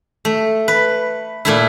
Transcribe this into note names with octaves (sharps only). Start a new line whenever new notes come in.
A3
B4
A#2 A3 E4